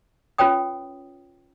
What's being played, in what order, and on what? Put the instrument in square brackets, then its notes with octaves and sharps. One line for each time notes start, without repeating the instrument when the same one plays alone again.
[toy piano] C#4 F4 B4 C#5 G5 D#6